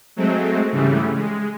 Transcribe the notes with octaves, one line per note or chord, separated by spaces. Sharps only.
F#3 G#3 A3 C4
G#2 C#3 E3 G3 A3
G#3